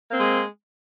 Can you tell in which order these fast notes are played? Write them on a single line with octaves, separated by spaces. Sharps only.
A#3 C4 G#3